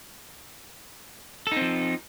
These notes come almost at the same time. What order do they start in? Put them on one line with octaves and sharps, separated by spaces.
A4 D#4 C4 F3